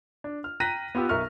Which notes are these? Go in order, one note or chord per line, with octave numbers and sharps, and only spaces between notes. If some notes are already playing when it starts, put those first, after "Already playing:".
D4
F6
G5 A#5 F#6 A#6 B6 D#7
B3 F4 G4 E6
B1 A#4 E5 C#6 F6